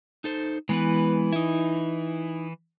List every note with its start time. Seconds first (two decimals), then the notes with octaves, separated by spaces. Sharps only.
0.24 D#4 A4 C5
0.69 E3 G#3 B3 B4
1.33 D#4 E4